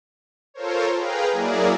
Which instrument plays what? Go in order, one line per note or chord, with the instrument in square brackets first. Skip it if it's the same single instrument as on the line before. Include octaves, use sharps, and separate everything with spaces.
[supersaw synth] F4 A4 A#4 C5 C#5
G#4 B4 F5 G5 A#5
F#3 A#3 E4 G#4 A#4 D5